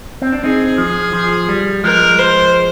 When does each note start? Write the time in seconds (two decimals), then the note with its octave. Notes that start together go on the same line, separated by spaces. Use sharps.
0.22 C4
0.32 D4
0.44 C4 D#4 G#4
0.78 F3
1.13 F3
1.49 G3
1.84 F3 G#3 A#4
2.19 C5